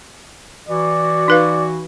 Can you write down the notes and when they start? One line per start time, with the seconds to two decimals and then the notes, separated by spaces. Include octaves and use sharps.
0.69 E3 F#4 D5
1.28 D#4 B4 F5